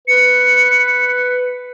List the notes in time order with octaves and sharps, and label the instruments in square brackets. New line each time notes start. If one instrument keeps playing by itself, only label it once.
[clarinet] B4 [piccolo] C#7